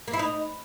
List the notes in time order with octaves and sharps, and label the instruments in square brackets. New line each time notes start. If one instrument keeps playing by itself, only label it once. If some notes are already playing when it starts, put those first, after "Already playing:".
[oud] A#3
E4
D#4